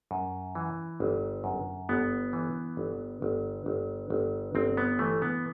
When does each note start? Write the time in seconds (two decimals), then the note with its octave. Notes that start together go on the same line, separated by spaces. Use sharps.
0.11 F#2
0.55 E3
1.00 G1
1.44 F#2
1.89 G1 B3
2.33 E3
2.77 G1
3.22 G1
3.66 G1
4.10 G1
4.55 G1 C4
4.77 B3
4.99 E3 A3
5.22 B3